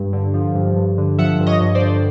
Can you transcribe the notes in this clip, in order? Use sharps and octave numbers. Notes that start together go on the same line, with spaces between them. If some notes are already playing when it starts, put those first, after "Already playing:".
Already playing: G2
D3
F3
G2
G2
D3
F3 E5 F#5
G2
C#5 D#5
G2
C5 D5
D3